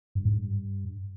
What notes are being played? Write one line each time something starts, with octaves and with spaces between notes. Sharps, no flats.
G2
G#2
G2